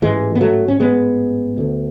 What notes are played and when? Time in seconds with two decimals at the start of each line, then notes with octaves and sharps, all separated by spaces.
0.02 A1 G#2 E3 G#3
0.35 B3
0.41 F#3 A3
0.68 C#4
0.80 G#3 B3
1.58 D2 D3